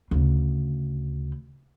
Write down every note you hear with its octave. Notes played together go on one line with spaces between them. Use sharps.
D2 C#3